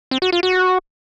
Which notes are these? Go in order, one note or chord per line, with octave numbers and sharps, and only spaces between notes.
C4
F#4
F4
F#4